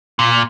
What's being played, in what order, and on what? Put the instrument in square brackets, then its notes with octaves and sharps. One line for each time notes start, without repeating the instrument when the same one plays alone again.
[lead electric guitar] A#2